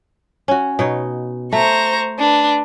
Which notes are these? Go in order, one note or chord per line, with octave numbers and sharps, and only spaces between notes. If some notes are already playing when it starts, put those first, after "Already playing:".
C#4 F#4
B2 D#4 C#5
A3 C5 A#5 C#6
D4 B4